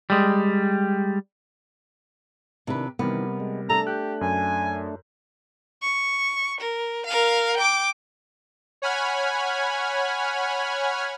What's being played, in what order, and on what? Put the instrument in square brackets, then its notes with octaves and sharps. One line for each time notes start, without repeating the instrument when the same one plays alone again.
[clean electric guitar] G3 G#3
[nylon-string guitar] C3 B4 [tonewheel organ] D#3 D4 E4
[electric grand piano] C3 G3 A#4 [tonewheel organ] D#3 E3 [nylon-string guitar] B3
[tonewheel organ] G#3
[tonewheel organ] A3 D4 [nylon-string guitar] A4 [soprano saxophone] A#5
[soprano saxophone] G4 [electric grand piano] F#6 G6
[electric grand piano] F#2 [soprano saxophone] G#5
[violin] C#6
A#4
A#4 F5
G5 D6
[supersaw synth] C#5 F#5 G#5 B5 F6 G#6